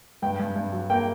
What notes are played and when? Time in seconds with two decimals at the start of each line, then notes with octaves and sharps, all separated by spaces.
0.22 G2 G5
0.40 G2
0.56 G2
0.72 F#3
0.90 A#3 G5